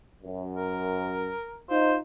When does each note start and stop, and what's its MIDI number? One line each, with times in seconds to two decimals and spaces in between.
0.23 1.32 42
0.56 1.61 70
1.70 1.98 63
1.70 1.98 65
1.70 1.94 72